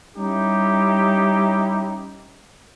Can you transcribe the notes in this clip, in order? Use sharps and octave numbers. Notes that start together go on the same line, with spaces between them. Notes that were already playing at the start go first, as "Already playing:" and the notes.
G3 C#4 D#4 E4 G4